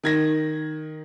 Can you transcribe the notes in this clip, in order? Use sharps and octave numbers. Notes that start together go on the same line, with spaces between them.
D#3 G#6 A#6